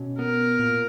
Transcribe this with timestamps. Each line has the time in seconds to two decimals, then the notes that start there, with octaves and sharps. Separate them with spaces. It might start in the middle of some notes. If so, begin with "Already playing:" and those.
Already playing: B2 C#4
0.19 B3 A#4
0.59 A#2